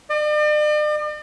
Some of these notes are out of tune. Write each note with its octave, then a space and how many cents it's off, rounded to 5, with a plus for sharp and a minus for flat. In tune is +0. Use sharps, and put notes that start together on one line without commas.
D5 +45